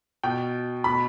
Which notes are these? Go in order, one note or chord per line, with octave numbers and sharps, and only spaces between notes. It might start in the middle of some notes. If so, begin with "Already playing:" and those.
B2 G5
B2 B5